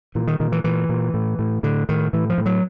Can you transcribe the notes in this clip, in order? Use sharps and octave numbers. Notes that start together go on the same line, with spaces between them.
A#2 E3
D#3
A#2 D#3
E3
A#2 E3
A#2
A2
A2
A2 D3
A2 D#3
A2 E3
F3
A2
F#3